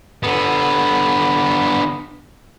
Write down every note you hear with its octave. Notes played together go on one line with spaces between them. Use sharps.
D3 B3